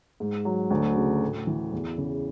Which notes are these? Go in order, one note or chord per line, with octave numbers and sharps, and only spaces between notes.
G#2
F#3
D2
C#3
A2
E3
E2
C#3